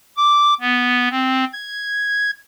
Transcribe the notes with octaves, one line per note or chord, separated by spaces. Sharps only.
D6
B3
C4
G#6